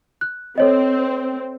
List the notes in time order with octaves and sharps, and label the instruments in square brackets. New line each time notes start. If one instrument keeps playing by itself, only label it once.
[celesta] F#6
[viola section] C4 [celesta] A4 C#5 D#5